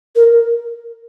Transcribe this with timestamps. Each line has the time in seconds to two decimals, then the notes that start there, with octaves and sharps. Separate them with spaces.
0.16 A#4